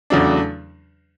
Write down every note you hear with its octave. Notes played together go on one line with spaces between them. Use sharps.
E2 C#3 F#3 A3 D4